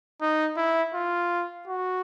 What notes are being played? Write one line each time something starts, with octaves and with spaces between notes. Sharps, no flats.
D#4
E4
F4
F#4